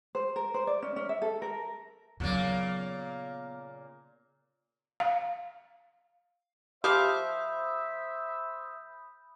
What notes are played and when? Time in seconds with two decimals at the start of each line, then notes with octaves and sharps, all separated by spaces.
0.15 C5
0.36 A#4
0.54 C5
0.67 D5
0.82 C#4
0.96 C#4
1.09 E5
1.22 A4
1.42 A#4
2.20 A#2 C#3 F#3 A#3 B3
5.00 F5
6.84 F3 G4 C5 E5 F5 B5 D#6 G6